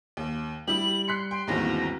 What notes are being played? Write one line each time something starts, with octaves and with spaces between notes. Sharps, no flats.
D#2
G3 E4 G4 F#7
C6 F#6 B6 C#7
G5 C6
G1 D#2 G#2 E3 C4 F#4 A#5